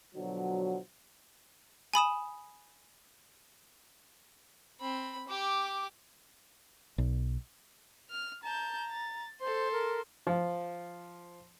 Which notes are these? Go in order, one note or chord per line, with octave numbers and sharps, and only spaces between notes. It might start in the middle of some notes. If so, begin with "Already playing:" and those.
B2 D3 F3 F#3
G#5 B5 D#6 E7
C4 B5
G4 D6
B1
F6
A5 A#5 G6
A6
A4 C5 C6
A#4
F3